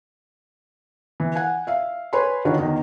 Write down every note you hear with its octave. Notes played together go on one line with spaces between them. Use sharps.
E3
F#5 G#5
E5 F5
B4 C#5 G#5 B5 C6
D3 D#3 D4 F4 F#4 C#5
E2 D#3